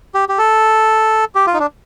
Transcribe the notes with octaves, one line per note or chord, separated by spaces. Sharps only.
G4
G4
A4
G4
F4
D#4
D4